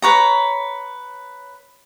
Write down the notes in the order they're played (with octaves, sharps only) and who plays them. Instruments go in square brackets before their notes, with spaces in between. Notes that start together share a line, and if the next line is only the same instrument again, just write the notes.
[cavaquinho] B4 C#5 A#5